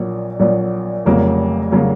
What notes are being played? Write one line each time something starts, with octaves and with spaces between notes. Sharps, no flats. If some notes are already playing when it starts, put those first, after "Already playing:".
Already playing: A#1 A#2 F#3
A#1 A#2 F#3
F1 F2 C#3 F#3 A#3
C#3 F#3 A#3